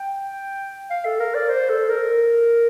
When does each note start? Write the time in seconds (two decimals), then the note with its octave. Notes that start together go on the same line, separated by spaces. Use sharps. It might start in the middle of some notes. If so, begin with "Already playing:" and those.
Already playing: G5
0.91 F5
1.06 A4
1.20 A#4
1.35 D5
1.49 C5
1.69 A4
1.89 A#4